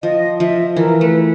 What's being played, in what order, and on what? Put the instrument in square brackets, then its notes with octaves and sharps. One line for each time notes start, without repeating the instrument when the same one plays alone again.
[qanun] F3 [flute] D#5
[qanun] F3 [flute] E5
[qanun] E3 [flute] A#4
[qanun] A3 [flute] B4